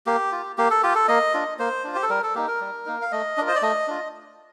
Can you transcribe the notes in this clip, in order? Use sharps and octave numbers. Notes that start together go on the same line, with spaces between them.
A#3 G4
F4
A#3 G4
A4
F4 G4
A4
A#3 D#5
D4 F4
A#3 C5
D4 F4
G4
A4
G3 A#4
A4
A#3 D#4 G4
A#4
G3
A#3 D#4
F5
A3 D#5
D4 F4 A#4
C5
D5
A3 D#5
D4 F4